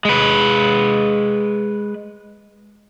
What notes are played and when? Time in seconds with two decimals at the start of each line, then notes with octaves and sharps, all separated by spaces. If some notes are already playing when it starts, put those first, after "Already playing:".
0.05 G#3 B4